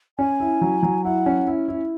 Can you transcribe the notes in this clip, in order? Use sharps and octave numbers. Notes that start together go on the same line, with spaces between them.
C#4 G#5
E4
F#3
F#3
E4 F#5
C#4
E4
E4